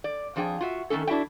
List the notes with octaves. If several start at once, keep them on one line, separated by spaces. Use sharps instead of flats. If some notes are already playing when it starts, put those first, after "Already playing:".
D5
F2 F3 D4 G#4 G5
F4 F#4 E5
D#3 E3 A3 C#4 A4
D4 E4 F#4 E5 G5